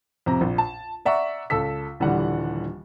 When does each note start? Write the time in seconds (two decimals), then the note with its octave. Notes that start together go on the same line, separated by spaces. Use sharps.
0.26 F2 C3 A#5
0.41 A#1
0.58 A5
1.05 D5 E5 F#5 A#5 C#6
1.50 C#2 A4 E6 B6
2.00 D#1 D3 E3 G3 F#5